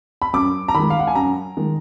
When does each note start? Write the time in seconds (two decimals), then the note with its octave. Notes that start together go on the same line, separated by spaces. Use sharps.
0.22 B5
0.33 F#2 D6
0.68 A#5
0.74 D#3 G#3 B5
0.90 F5
0.99 F#5
1.07 G#5
1.15 F#2 A#5
1.57 D#3 G#3